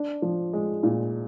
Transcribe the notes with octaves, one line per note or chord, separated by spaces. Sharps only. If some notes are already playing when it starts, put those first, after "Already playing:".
Already playing: D4
F3
G#3
A#2